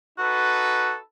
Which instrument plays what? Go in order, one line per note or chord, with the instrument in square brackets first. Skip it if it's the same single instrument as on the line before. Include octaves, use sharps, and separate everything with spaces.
[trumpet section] D#4 A4 B4 [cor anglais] F#4